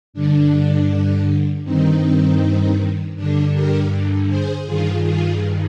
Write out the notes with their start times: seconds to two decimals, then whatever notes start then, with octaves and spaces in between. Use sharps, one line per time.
0.13 G2 D3 D4
1.65 G2 D#3 C4 D#4
3.16 G2 D3 D4
3.53 G4 A#4
4.28 G#4 C5
4.66 G2 D#3 F4 G#4
5.04 F4 G#4